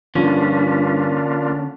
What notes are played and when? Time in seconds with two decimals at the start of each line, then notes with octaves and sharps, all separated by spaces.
0.16 G2 D3 F3 A#3 C#4 D4 F4